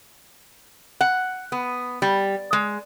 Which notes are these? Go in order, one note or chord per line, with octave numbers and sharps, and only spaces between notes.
F#5
B3
G3
G#3